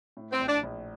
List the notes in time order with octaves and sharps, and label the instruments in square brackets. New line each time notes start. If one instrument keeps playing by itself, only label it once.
[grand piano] A2
[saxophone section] C4
[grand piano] A#1
[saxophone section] D4
[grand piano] A#1